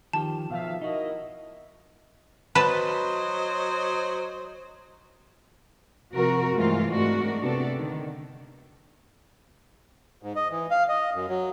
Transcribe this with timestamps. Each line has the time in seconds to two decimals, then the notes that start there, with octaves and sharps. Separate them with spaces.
0.13 D#3 F3 G4 A5
0.50 B1 B2 F3 E5 F5
0.81 D#4 E4 F#4 A#4 D#5
2.55 F#3 B4 C5 D#5 A5
6.13 C3 F3 F#4 A#4
6.55 G2 E3 G#3 A3 C4 F4
6.88 G#2 G#3 A3 D4 F#4 A#4
7.43 C3 B3 D4 A4
7.76 D3 D#3
10.23 G#2
10.36 D#5
10.51 E3
10.71 F5
10.88 D#5
11.14 F#2
11.29 F#3